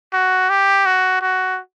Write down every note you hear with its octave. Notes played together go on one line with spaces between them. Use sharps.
F#4
G4
F#4
F#4